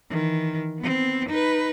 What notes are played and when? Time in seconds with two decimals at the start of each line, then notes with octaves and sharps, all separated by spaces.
0.10 D#3 E3
0.79 B3 C4
1.29 D#4 B4